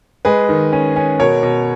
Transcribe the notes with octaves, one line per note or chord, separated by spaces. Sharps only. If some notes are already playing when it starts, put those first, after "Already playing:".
G#3 G#4 B4
D#3
C#4
C#4
B2 A#4 C#5
B2